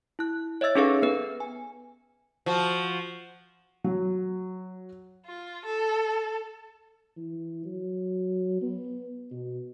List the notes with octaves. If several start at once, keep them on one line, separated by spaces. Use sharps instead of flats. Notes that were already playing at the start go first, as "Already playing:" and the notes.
E4 F#6
C#5 D#5 E5 E6 A6
C#4 D#4 G#4 A4 B4 F5
B3 B4
G#5
F3 F#4
F#3
F4
A4
E3
F#3
B3
B2